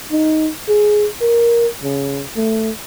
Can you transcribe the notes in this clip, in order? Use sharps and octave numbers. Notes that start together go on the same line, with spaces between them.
D#4
G#4
A#4
C#3
A3